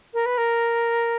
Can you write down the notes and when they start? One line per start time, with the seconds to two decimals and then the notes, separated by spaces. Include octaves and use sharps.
0.13 A#4
0.25 B4
0.37 A#4